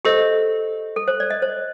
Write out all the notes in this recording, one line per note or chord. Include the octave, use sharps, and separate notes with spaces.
G4 A4 C5 D#5
A4
C5
D5
D#5
C5